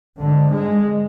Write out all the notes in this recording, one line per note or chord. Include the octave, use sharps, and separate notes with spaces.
G#1 G#2 D3
G#3